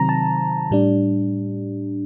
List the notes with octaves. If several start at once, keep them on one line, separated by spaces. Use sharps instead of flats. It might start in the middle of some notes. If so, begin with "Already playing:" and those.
Already playing: C3 D#3 F#3 C4 A#5
A5
A2 G3 D4